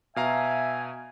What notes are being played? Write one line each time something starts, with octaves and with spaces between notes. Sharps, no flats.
B2 E5 F5 G#5 A#5